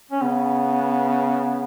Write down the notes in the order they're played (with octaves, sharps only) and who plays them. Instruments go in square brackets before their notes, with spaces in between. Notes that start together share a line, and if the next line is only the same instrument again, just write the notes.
[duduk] C#4
[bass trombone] C#3 [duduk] B3